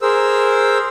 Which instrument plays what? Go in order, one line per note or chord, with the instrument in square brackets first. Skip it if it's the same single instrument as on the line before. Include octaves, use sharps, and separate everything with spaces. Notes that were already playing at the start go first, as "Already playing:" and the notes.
[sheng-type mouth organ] G#4 A#4 C5 E6